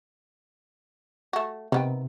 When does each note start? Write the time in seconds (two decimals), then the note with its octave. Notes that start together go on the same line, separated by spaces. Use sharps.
1.33 A3 F#4
1.72 C3 D#3 B3 G5